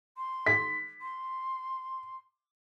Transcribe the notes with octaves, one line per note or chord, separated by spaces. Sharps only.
C6
B6
C6